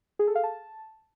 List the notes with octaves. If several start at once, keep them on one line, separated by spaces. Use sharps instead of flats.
G#4
A4
F5
A5